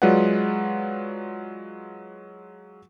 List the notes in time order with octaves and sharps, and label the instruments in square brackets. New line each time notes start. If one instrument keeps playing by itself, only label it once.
[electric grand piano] F#3 G#3 F4 B4 D5 F#5